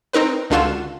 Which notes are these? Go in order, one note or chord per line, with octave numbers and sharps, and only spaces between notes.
C4 D#4 A#4 B4
C#2 D3 F4 F#4 E7